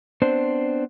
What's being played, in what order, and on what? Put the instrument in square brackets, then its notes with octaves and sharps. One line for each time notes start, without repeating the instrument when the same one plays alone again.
[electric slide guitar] B3 C4 D4 C5